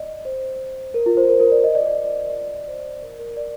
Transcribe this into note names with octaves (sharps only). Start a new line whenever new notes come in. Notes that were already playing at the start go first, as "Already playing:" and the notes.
Already playing: D5 D#5
C5
A#4
F4
C5
A#4
A#4
D5
D#5
D5
D5
C5
A#4
A#4
D5